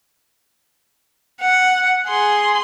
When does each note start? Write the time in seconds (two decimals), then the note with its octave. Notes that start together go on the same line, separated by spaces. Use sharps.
1.41 F#5
2.08 G#4 C6